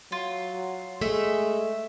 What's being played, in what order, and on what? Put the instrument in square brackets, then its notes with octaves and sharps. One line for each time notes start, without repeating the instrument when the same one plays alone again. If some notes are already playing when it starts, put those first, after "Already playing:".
[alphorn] F#3 [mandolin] F4
[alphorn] G#3 [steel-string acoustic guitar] A3 [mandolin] E5